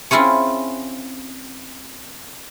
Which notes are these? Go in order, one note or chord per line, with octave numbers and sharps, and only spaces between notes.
C4 C#4 E4 F4 G#4 C#5